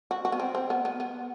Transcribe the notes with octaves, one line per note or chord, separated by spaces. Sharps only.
F#4
F#4
B3
C4
C4
B3
B3
B3